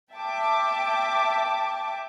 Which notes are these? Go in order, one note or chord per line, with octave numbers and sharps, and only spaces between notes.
E5 G5 A5 D6